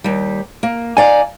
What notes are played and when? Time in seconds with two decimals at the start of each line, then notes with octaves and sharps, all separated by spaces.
0.04 D#2 G3
0.63 A#3
0.97 D#4 D5 F5 G#5